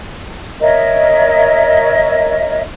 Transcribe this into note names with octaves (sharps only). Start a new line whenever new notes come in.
A#4 C#5 D#5 E5